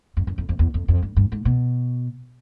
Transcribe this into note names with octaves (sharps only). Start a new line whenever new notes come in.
F#2
F#2
F2
F2
E2
F2
F2
G2
G2
G#2
B2